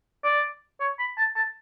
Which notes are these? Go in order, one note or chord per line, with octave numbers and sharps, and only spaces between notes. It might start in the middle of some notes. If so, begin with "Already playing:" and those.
D5
C#5
B5
A5
A5